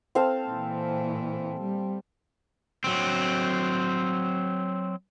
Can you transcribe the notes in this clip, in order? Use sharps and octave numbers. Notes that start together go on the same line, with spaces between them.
C4 A4 F5
A#2 E3
G3
F#3 C4